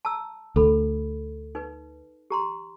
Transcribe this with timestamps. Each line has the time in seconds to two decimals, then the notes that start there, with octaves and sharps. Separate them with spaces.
0.05 A5 A#5 E6
0.56 D2 A4 B5
1.55 D#4 B4
2.30 G4 A#5 C6